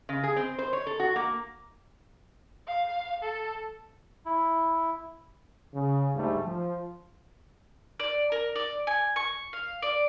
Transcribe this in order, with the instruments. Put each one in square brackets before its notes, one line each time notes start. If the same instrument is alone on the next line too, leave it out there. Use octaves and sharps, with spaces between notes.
[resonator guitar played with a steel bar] C#3
G#4
C4
C5
C#5
A4
F#4
A#3
[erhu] F5
A4
[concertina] E4
[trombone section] C#3
D2 G#2 G3 A3
F3
[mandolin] D5
A#4
D5
G#5
C#6
F5
D5